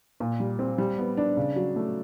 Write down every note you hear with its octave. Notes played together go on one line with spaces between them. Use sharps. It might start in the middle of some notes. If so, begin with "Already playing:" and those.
A#2
G3
C4
G3
B3
D4
C#3
F#3
A3